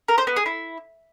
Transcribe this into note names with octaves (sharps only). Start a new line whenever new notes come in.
A#4
C5
B3
G#4
E4